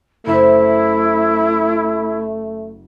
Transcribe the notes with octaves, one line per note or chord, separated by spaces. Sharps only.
F#1 A3 E4 C5 E6